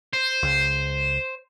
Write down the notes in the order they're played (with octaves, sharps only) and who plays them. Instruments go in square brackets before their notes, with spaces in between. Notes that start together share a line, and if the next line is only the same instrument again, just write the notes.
[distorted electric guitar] C5
[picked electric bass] C#2